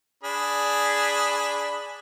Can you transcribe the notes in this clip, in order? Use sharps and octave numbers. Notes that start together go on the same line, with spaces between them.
D4 G#4 B5